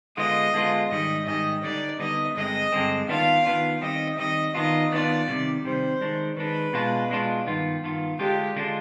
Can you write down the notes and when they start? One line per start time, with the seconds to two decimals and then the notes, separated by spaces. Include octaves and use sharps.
0.17 D3 G#3 B3 F4 D#5
0.54 D3 G#3 B3 F4
0.90 G#2 D#3 G3 D#5
1.27 G#2 D#3 G3 D#5
1.64 D3 G3 B3 D#4 D5
1.99 D3 G3 B3 D#4 D#5
2.36 G2 D3 G#3 C4 D#5
2.72 G2 D3 G#3 C4
3.08 D#3 B3 D4 F4 F5
3.46 D#3 B3 D4 F4
3.82 D#3 G3 C4 D#5
4.18 D#3 G3 C4 D#5
4.55 D#3 B3 D4 F4 D#5
4.92 D#3 B3 D4 F4 D5
5.28 C3 D#3 G3
5.65 C3 D#3 G3 C5
6.01 D#3 G#3 D4
6.37 D#3 G#3 D4 B4
6.73 B2 G#3 D4 F4
7.10 B2 G#3 D4 F4
7.47 G2 D#3 B3 F4
7.83 G2 D#3 B3 F4
8.19 D3 G#3 D4 F4 G4
8.56 D3 G#3 D4 F4